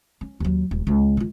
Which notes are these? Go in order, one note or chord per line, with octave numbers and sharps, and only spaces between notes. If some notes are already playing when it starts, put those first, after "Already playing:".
C#4
D#2 F#3
D#1
C#2
D#3 F4